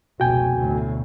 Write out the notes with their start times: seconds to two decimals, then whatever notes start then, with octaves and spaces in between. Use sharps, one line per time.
0.20 F1 C#2 B2 F#4 G5 G#5
0.56 D2 A2